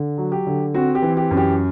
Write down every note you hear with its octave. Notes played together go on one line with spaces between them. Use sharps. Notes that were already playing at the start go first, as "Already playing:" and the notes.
Already playing: D3
F#3
G4
D3
C4 F#4
G4
E3
G4
F#2
G4